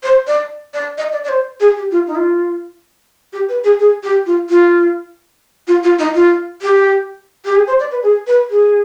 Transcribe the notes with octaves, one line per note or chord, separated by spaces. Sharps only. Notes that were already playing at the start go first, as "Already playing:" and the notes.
C5
D5
D5
D#5
D5
D5
C5
G#4
G4
F4
D#4
F4
G4
B4
G#4
G#4
G4
F4
F4
F4
F4
D#4
F4
G4
G4
G#4
C5
D5
B4
G#4
B4
G#4